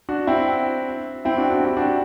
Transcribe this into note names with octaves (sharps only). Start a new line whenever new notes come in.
D4 F#4
C4 E4
C4 E4
D4 F#4
D4 F#4
E4 G4
D4 F#4